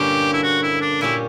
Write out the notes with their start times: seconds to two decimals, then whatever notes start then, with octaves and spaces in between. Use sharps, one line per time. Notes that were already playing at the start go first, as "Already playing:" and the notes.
Already playing: G2 A#2 D3 A#3 C#4 G4
0.33 E4
0.43 F#4
0.63 E4
0.81 D4
1.01 A#2 A#3 C#4 E4 G4